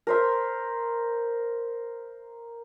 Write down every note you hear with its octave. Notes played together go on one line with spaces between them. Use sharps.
A#4 C5 E5